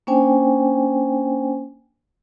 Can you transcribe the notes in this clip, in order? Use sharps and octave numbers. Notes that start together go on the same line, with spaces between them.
A#3 C#4 D4 C5 G5 G#5